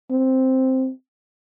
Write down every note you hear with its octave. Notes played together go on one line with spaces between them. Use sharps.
C4